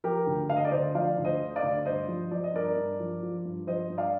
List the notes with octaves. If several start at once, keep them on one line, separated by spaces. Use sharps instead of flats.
F3 G4 A#4
D2
D3 F5
D#5
D5
D2 C5 D#5
F3 D5 F5
D2
C5 D#5
D3
D5 F5
D2
G2 C5 D#5
F3
F3 D5
D#5
G2 A#4 D5
G2
F3
F3
G2
F3 C5 D#5
G2
D5 F5